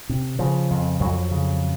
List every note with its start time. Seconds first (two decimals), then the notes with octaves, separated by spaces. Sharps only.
0.09 C3
0.39 C#3 F3
0.71 F2
1.00 F2 F#3
1.31 C#3